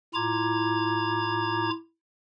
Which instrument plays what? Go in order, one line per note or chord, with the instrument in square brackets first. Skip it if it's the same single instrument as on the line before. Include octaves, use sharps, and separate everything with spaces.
[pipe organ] A2 E4 F4 A#5 D6 G#6